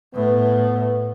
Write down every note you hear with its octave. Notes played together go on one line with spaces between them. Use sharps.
A2 B3